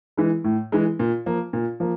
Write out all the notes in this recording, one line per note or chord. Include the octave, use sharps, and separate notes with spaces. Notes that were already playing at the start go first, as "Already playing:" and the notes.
E3 G#3
A2
E3 G#3
A#2
F3 A#3
A#2
F3 A#3